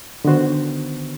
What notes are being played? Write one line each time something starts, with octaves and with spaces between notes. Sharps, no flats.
D3 D#3 B3 F#4 C5